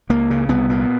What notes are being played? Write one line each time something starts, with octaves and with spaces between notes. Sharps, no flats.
C#2 A#3
C#3
C2 B3
A#2